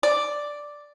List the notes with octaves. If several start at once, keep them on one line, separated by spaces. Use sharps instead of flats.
D5